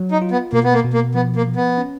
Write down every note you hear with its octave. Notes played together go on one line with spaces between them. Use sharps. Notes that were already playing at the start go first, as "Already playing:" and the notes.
Already playing: F#3
D#4
F4
B3
B2 A#3
B3
A#3
B2
A#3
F3 B3
A#3
F3
B3
C#4